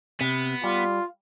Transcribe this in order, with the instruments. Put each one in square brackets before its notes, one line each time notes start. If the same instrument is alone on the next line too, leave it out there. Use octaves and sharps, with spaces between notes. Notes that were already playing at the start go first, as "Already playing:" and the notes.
[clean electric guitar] C3 [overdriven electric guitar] B3
[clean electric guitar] G3 [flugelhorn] F4